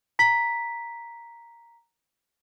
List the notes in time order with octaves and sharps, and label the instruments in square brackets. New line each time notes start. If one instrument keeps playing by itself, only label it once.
[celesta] A#5 B6